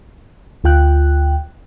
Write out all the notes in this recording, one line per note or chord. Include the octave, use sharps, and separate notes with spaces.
D2 F4 G5 F#6